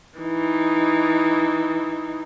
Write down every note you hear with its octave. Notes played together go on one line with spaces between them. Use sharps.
E3 D#4